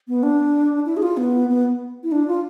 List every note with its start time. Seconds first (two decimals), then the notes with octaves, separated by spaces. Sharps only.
0.08 B3
0.23 D4
0.86 E4
0.97 G#4
1.02 F4
1.17 B3
1.49 B3
2.03 E4
2.12 D4
2.28 F4